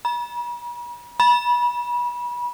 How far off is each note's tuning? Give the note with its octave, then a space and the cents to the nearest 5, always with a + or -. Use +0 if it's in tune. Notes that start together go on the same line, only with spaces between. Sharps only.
B5 -45
B5 -30